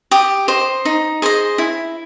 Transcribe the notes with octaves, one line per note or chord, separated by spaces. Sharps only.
G4 D#6
C5 D#5
D#4
G#4 C5 D#5
E4